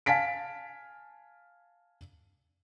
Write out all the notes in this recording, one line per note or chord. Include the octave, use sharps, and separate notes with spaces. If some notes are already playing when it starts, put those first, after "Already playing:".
F5 G#5 A5 B6 D7